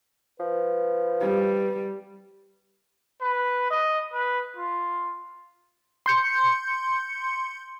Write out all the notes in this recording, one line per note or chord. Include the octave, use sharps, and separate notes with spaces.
F3 B4
G3
B4
D#5
B4
F4
C6 G6 C#7